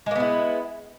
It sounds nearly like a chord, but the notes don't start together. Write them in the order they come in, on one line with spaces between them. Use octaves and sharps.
G#3 A#3 B3 E4